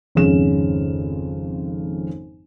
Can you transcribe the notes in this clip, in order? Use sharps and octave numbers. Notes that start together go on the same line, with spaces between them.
G#1 F2 C#3 E7